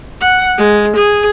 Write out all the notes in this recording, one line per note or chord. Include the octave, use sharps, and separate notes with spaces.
F#5
G#3
G#4